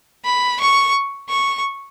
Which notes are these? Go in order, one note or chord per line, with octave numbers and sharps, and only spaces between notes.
B5
C#6
C#6